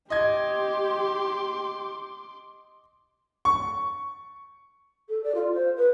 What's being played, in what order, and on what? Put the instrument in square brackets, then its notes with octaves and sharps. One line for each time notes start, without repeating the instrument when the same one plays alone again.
[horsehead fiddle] G4 [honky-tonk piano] D#5 G#6 [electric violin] C6 D6
[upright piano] C#6
[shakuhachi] A4
D5
F4
C5
B4